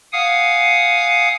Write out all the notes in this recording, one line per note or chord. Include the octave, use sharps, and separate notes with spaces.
F5 F#5 G#5 D#6